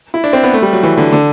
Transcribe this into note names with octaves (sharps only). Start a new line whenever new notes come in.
E4
D4
C4
B3
A3
G3
F#3
E3
D3
D3